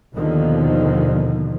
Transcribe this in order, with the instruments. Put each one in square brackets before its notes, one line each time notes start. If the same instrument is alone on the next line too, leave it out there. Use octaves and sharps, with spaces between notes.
[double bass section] D#2 B2 D3 D#3 F3